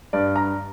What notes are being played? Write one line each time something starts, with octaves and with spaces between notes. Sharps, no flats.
G2 D5
A#5